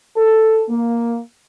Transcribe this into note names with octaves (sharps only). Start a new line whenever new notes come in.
A4
A#3